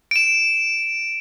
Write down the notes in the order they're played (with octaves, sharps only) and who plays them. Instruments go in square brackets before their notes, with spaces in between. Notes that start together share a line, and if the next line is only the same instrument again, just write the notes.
[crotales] D7 E7